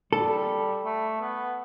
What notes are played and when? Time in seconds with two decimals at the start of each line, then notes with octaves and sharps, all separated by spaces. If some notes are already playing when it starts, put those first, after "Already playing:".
0.12 G3 A4
0.85 A3
1.21 B3